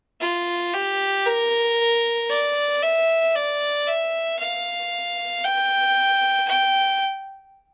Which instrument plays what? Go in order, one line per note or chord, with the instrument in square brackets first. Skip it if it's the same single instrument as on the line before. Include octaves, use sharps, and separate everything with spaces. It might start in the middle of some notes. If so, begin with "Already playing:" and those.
[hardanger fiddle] F4
G4
A#4
D5
E5
D5
E5
F5
G5
G5